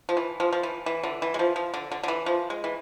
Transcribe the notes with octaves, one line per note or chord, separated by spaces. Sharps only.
F3
E3
F3
F3
E3
E3
D3
E3
G#3
F3
F3
D3
D3
D3
E3
F3
G#3
E3